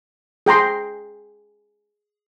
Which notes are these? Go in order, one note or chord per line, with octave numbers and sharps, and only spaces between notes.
G#4 G5 A#5 C6